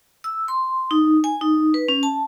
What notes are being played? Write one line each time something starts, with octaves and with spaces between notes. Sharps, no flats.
E6
C6
D#4
G#5
D#4
B4
C#4
A5